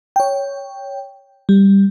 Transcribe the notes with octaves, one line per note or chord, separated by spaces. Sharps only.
C#5 G5
G3